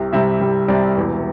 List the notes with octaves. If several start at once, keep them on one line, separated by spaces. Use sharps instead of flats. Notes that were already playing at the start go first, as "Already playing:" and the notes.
Already playing: C2 C3
C2 C3 G3 E5
C2 C3 G3
C2 C3 G3 D5
E1 E2 E3